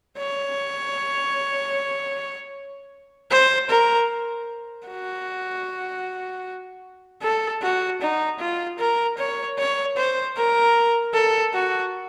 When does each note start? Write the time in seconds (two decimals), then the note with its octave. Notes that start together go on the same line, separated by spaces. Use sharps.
0.17 C#5
3.31 C5
3.70 A#4
4.88 F#4
7.22 A4
7.62 F#4
8.01 D#4
8.39 F4
8.79 A#4
9.18 C#5
9.58 C#5
9.97 C5
10.37 A#4
11.14 A4
11.53 F#4